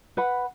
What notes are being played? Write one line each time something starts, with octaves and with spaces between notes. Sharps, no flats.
B4 F#5 B5